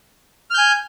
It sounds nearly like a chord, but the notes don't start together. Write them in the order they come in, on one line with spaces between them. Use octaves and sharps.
F6 G6 G#5